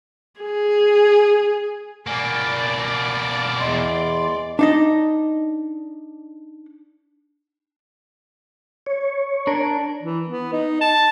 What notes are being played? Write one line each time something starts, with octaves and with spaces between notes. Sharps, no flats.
G#4
B2 A#3 D5 G#5
E2 D#5 C6
D4 D#4 D#5
C#5
D4 A#4
E3
B3
D#4
A5